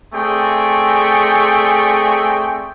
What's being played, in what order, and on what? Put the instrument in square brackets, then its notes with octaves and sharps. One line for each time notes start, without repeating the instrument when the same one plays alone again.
[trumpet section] A3 C4 G#4 D5 G5 C#6